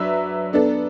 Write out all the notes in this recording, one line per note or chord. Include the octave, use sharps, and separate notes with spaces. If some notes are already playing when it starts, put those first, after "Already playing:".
Already playing: F#3 D4 B4 E5
B3 D4 A4